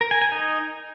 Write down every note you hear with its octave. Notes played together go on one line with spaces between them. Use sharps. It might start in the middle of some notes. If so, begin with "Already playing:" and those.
A#4
G#5
G#5
D#4